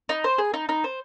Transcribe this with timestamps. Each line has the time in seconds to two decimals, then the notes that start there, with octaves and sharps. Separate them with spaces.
0.09 D#4
0.24 C5
0.38 G#4
0.54 D#4
0.69 D#4
0.84 C5